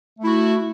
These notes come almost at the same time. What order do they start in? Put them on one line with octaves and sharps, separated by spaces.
A3 E4 F#4